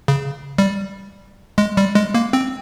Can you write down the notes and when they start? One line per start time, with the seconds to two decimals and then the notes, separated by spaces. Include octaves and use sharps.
0.08 C#3
0.58 G3
1.58 G#3
1.77 G3
1.95 G#3
2.14 A#3
2.33 C4